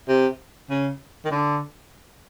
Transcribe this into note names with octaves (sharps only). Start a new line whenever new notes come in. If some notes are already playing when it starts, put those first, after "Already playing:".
C3
C#3
D#3
D3